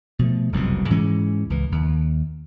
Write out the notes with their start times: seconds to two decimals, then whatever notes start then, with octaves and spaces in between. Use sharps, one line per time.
0.19 B2 F3 A3
0.52 F#1 C2 F2 B2
0.90 G#2 E3 G#3 C#4
1.50 C#2 E3
1.72 D#2